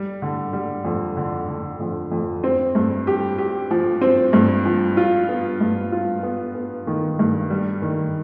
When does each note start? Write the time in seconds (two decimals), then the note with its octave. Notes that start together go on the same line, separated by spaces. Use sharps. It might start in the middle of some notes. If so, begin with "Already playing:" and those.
Already playing: G3
0.22 D3
0.53 G3
0.85 F2
1.17 D3
1.48 D3
1.80 F2
2.12 F2
2.44 C4
2.75 G2
3.07 G4
3.38 G4
3.71 F3
4.01 C4
4.33 G2
4.65 F3
4.97 F4
5.29 B3
5.61 G2
5.92 F4
6.23 B3
6.55 B3
6.87 D#3
7.19 G2
7.50 G3
7.82 D#3